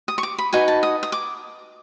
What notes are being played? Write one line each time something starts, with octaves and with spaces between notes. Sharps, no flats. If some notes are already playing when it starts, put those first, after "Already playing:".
D#6
C#6
D6
B5
D#4 F#4 B4 G#5
A5
D#6
D#6
D6